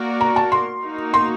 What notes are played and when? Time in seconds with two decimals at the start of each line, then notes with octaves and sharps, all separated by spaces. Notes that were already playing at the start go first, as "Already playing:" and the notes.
Already playing: A#3 F#4 A#4 D5
0.21 A#5
0.36 A5
0.52 C6
0.83 A#3 D#4 F#4 A#4
1.14 C6